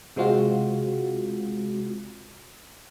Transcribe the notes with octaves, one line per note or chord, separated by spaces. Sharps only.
C3 G#3 C4 F4 F#4